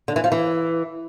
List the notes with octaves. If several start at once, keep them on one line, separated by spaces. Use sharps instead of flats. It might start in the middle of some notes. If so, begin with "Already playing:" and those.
D3
E3
F3
E3